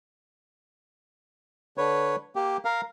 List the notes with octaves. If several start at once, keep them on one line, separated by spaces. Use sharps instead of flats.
D3 B4 C#5
A#3 G4
A#4 F5